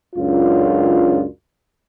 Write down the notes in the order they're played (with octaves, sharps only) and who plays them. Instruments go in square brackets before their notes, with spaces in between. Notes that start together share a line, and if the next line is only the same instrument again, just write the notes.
[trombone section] C#2 F#2 D4 F4